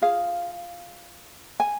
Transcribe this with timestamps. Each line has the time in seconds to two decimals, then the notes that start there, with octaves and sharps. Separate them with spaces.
0.02 F4 G#4 F5
1.60 G#5